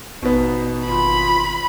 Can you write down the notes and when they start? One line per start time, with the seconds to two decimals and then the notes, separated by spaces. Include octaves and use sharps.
0.22 A1 B2 B3 D#4
0.88 G#1 F4 B5